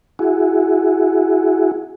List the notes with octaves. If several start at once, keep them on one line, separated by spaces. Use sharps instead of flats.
E4 F#4 G#4